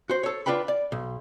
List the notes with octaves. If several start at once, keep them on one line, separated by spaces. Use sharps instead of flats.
F#4 C5
A4 C#5
D4 F4 B4 G5 B5
D5
B1